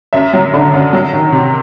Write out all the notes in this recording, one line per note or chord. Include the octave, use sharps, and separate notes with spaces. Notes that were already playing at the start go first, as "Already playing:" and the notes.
F#2 E5
F#3
D3
F#2
F#3
D#3
C3